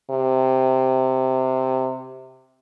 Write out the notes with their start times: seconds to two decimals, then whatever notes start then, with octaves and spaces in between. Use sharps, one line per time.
0.10 C3